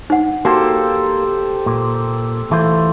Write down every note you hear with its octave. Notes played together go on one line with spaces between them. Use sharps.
D#4 F#5
A#3 F#4 G4 A4 C5
A#2
E3 A3 F4 C5